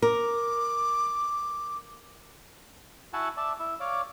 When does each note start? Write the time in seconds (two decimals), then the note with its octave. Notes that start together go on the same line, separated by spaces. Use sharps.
0.02 A#4 D6
3.13 E4 F#4 E5 F#5 G#5 A5
3.37 D5 E5 A5
3.60 E4 E5
3.80 C#5 D5 F5 D6